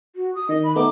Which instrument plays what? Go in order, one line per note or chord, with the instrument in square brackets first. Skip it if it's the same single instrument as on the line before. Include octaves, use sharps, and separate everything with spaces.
[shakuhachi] F#4
D#6
[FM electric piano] D#3 [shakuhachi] D#5
[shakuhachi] B5
[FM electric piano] A3 B3 D#4 [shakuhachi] D6